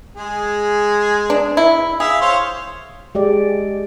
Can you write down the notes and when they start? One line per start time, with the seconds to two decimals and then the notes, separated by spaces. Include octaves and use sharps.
0.17 G#3 G#4
1.30 D4
1.57 E4
2.00 G#4 E5 F5
2.21 C5 C#5 F5
3.15 G#3 G4 D5